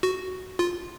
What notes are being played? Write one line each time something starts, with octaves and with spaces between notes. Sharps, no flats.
F#4
F4